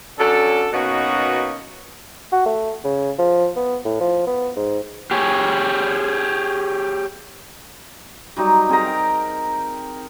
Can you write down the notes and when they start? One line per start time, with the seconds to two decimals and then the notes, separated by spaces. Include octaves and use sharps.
0.18 F#3 C#4 D4 A4
0.72 B2 A#3 B3 C#4 D#4 F#4
2.32 F#4
2.46 A3
2.84 C#3
3.18 F3
3.56 B3
3.85 A2
4.00 F3
4.27 B3
4.56 G#2
5.11 G4 G#4 C#5
8.37 F#3 G3 D#4
8.69 C4 G#4 A#4 A#5
8.86 G5